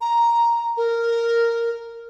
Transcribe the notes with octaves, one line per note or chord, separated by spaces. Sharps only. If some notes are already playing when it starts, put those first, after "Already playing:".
A#5
A#4